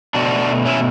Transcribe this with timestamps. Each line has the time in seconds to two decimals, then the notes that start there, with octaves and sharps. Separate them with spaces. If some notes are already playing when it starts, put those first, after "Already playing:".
0.14 B2 A3 D4 F#4
0.66 C#4 E4